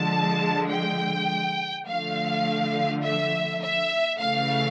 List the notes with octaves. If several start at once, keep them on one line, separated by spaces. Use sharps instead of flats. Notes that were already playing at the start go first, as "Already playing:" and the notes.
Already playing: D3 F3 G#3 A5
G5
D3 F3 A3 F5
E5
E5
C#3 E3 A3 F5